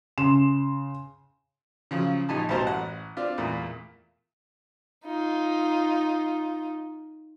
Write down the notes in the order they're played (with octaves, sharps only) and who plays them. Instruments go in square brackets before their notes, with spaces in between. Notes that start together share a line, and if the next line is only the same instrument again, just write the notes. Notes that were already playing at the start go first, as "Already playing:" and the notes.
[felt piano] C#3 C6 E7
[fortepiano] C#3 F3 F#3
A#1 D#4 G4 G#5 A5 B5
B1 F#2 A2 C5 A5 A#5
A1 F#5
C4 D4 F4
E2 A#2 A3 A#3
[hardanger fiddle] D#4 F4